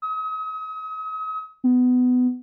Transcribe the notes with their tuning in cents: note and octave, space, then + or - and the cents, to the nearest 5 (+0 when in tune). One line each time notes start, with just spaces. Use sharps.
D#6 +40
B3 +20